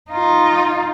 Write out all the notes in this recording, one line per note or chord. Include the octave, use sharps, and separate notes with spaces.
D#4 F4